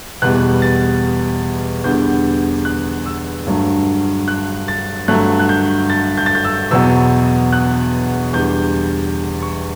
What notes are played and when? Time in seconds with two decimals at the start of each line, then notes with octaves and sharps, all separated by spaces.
0.22 E2 B2 G3 B3 F#6
0.62 A6
1.84 E2 D3 G3 B3 G6
2.65 F#6
3.06 E6
3.47 G2 D3 F#3 A3
4.28 F#6
4.68 A6
5.08 G2 D3 F#3 A3 F#6
5.39 F#6
5.49 G6
5.90 A6
6.17 G6
6.26 A6
6.35 G6
6.45 E6
6.71 E2 B2 F#3 B3 E6
7.52 F#6
8.33 E2 D3 G3 G6
9.42 C#6